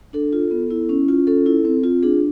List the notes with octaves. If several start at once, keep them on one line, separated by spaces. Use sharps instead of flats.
D4 A4
F4
B3
E4
C#4
F4
C#4 A4
E4
C4
F4
D4 G#4